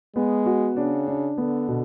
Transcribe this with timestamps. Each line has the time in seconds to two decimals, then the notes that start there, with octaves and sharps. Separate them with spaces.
0.16 G#3 B3
0.46 F#4
0.76 C#3 D4
1.08 D4
1.38 D3 B3
1.68 B2